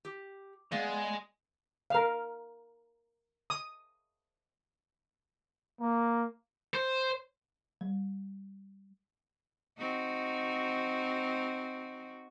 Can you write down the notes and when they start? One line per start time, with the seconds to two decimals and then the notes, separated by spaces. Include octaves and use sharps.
0.05 G4
0.72 G#3 B3 D5 F5
1.90 A#4 F5
3.50 D#6
5.80 A#3
6.74 C5
7.81 G3
9.78 C4 D#4 F#4